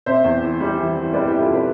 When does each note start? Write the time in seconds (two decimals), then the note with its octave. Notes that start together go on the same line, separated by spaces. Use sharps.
0.06 C3 C5 E5
0.24 E2
0.42 E3
0.60 G3
0.79 E3
0.96 E3
1.13 G3 B4 D5
1.27 E4 G4
1.32 G3
1.40 F4 A4
1.50 C3 B4 D5